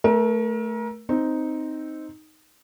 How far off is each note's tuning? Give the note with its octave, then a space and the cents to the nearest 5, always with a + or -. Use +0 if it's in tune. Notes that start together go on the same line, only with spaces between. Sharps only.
A3 +0 A#4 +30
C4 +0 D#4 +0